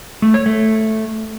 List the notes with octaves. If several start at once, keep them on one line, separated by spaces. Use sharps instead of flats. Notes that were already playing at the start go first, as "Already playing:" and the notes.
A3
C#5
A3